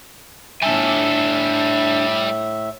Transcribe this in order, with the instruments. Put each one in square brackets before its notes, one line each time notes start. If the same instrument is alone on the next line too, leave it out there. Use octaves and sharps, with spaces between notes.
[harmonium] A2 E5 [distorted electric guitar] G3 A4 [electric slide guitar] D4 G#5